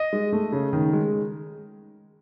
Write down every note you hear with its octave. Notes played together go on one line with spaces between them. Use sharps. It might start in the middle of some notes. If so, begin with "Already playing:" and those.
Already playing: D#5
G#3
A3
C#3
D#3
G#3